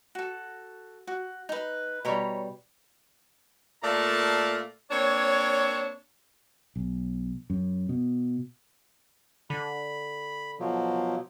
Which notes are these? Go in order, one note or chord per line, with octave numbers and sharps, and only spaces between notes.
F#4 A4
F#4
D#4 B4
B2 G3 C#5 A#5 B5
A#2 A3 A#4 D5 F5 A5
A#3 C4 D4 C#5
B1
F#2
B2
D3 B5
B2 F3 F#3